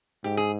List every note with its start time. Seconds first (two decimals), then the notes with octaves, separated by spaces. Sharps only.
0.24 G#2 G4
0.37 G#4